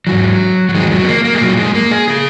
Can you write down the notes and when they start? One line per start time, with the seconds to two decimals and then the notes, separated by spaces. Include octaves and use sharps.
0.07 G#2 E3 F#3
0.69 F#3
0.75 E2 D#3 G#3
0.91 F#3
1.04 B3
1.08 A#3
1.25 A#3
1.34 G#3
1.41 A#2 F#3
1.57 G#3
1.75 A#3
1.91 G#4
2.08 C#3 G#4